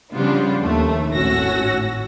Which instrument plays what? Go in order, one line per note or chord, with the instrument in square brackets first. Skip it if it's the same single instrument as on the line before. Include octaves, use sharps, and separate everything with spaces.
[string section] C#3 F3 G3 B3 D4 F4
D#2 A3
G#1 A2 C#4 F#4 E6 A#6